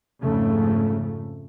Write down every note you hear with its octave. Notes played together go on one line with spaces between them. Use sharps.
F2 G#2 C#3 A3